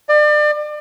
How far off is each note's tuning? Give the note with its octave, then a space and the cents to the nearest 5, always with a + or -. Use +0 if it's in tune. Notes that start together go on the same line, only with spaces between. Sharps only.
D5 +35